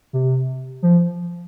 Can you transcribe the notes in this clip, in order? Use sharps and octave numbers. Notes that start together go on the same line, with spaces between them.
C3
F3